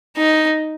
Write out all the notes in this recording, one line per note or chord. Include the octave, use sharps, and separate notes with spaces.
D#4